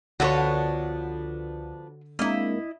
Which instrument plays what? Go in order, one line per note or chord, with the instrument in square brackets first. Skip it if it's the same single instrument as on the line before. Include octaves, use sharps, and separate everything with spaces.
[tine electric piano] C#2 [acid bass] D3 [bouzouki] F3 B3 D4 [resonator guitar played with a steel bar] F#4 A4 C#5
[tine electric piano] G#3 C4 D4 [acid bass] A#3 [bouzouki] E4 D#5